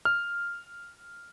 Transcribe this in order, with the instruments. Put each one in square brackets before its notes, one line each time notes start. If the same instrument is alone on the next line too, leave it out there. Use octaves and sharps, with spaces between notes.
[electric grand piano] F6